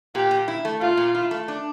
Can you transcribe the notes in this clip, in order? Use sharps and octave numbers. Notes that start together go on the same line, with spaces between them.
A#2 G4
A#2
E4
A3
A#2 F4
A#2
E4
A3
D4